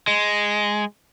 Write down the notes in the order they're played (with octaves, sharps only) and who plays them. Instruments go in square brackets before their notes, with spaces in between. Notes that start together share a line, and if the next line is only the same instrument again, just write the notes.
[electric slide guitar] G#3